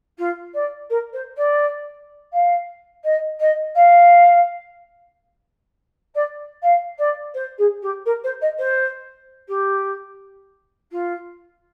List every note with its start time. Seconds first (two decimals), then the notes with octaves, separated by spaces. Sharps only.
0.18 F4
0.54 D5
0.90 A#4
1.13 C5
1.37 D5
2.33 F5
3.04 D#5
3.40 D#5
3.75 F5
6.15 D5
6.62 F5
6.98 D5
7.34 C5
7.58 G#4
7.82 G4
8.06 A#4
8.24 C5
8.41 D#5
8.58 C5
9.48 G4
10.91 F4